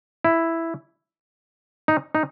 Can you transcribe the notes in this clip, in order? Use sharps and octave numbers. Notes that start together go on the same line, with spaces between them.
E4
D#4
D#4